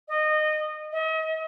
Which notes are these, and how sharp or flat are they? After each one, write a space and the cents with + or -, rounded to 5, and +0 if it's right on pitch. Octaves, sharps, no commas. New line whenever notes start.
D#5 -20
D#5 +45